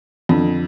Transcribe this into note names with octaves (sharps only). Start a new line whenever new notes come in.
F2 D3